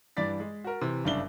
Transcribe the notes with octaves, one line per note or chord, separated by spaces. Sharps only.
G2 E3 D5 A6 B6
G#3
F#4 A#4
C3 E3
F#1 G2 C#3 D4 E5 G7